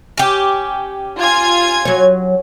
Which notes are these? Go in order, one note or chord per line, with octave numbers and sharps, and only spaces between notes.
C#4 G4
F4 G#5 G#6
F#3 C#5